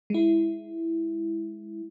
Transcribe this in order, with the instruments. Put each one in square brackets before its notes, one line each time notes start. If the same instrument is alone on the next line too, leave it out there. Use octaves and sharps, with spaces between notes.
[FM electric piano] G#3 E4